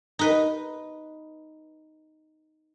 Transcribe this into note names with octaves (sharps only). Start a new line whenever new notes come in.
D#4 B4